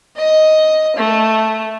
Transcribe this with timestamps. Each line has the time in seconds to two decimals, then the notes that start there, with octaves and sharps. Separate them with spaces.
0.17 D#5
0.97 A3